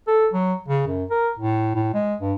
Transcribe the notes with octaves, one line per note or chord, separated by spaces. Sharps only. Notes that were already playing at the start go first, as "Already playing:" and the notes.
A4
F#3
C#3
F#2
A#4
A2
A2
G#3
G2